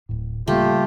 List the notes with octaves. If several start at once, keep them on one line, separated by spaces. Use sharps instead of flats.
D1 A2
C#3 G3 A3 A#3 F4 G4